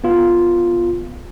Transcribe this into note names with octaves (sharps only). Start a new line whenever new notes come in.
B3 F4